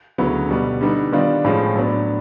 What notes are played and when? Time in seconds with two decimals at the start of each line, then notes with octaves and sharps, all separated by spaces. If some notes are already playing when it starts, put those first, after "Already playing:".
0.18 D2 C#3 F#3 B3 E4
0.49 B2 G3 B3
0.81 D3 G3 B3 D#4
1.12 D#3 G3 B3 D4 F4
1.45 A2 F3 G#3 C#4
1.76 A2 F#3 B3 D4